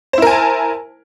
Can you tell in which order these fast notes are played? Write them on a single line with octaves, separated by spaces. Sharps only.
C5 E4 A#4 G#5 A5